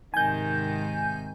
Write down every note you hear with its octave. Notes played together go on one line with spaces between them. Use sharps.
G#2 C3 D#3 G#5 G6